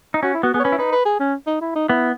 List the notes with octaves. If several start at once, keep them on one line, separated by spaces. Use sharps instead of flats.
D#4
C#4 F#4
E4
B3 F#4
B3 G#4
C#5
C#4 B4
E4
D#4 B4
B4
G#4
C#4
D#4
E4
D#4
B3 E4